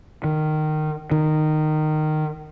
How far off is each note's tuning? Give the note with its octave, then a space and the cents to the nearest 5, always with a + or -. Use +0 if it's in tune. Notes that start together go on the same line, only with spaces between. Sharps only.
D#3 -15
D#3 -15